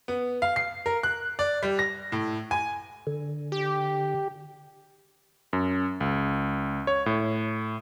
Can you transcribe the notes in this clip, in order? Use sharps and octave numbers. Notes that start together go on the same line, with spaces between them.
B3
F5
C7
A#4
F#6
D5
G3
A#6
A2
G#5
D3
G4
F#2
C#2
C#5
A2